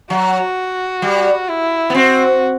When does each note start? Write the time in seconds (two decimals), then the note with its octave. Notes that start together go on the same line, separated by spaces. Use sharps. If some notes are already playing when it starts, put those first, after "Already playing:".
0.10 F#3 F#4
1.02 G3
1.49 E4
1.90 B3
1.95 C4 F#4